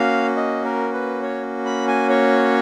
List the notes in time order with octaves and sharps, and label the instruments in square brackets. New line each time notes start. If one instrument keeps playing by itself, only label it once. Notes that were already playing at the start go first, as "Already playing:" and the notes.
Already playing: [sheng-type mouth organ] A#3 C#4 F#4 F5
D#5
A#4
B4
C#5
B5
G#5
C#5